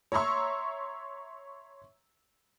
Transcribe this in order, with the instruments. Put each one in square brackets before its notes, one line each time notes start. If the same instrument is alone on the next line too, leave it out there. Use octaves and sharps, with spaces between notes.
[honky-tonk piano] C#5 E5 A#5 C6 C#6 E6